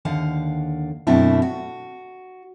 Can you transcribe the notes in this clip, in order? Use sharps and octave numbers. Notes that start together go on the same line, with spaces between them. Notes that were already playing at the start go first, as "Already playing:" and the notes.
D#2 D3 F5 F#5
F#2 B2 A3 C4 D4 E4
F#4